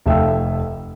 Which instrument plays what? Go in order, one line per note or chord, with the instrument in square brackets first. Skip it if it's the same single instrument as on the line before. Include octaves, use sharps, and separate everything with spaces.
[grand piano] F1 A3 E5 F5 G5 E6